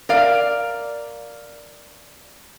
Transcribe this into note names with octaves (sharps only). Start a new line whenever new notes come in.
A#4 D5 F5